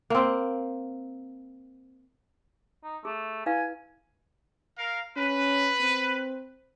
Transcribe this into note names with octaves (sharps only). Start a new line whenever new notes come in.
A#3 C4
D#4
A3 G#4
E4 B4 F5 G#5
A#4 F5
C#4 B4
C4